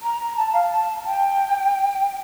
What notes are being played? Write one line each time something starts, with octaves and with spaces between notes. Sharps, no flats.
A#5
A#5
A5
F5
A5
G5